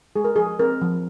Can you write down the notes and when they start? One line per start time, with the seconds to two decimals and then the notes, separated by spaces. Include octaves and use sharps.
0.16 G#3 G#4
0.25 A#4
0.36 F3 G#4
0.59 C4 A#4
0.81 F3